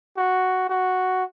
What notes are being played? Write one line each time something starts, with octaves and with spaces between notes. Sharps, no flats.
F#4
F#4